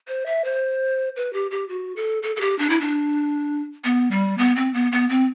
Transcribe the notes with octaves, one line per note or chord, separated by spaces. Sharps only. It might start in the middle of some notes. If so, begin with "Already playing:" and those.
C5
E5
C5
B4
G4
G4
F#4
A4
A4
A4
G4
D4
E4
D4
B3
G3
B3
C4
B3
B3
C4